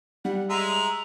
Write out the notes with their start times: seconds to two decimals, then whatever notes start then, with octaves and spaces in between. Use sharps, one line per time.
0.25 G3 F#5
0.49 G#3 E5 A#5